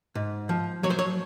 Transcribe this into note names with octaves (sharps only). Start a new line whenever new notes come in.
G#2
F3
F#3 C#5
C5
C#5